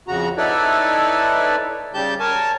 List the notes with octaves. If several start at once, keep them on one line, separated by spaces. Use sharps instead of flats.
F2 C#3 F#4 A#5
D#4 E4 A4 B4 C#5 D5
C#3 G3 G4 A5 G6
A#4 C#5 G#5 A5